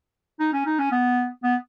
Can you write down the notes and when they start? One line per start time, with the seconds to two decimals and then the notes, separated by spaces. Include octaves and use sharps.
0.40 D#4
0.53 C#4
0.66 D#4
0.79 C#4
0.92 B3
1.43 B3